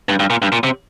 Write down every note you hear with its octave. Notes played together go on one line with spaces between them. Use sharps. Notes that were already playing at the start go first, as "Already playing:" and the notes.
G2
G2
A#2
G2
A#2
C3